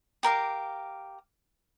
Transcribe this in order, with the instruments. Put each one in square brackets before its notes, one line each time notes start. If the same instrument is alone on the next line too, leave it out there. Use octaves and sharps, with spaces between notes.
[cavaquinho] G4 A#4 F5 D6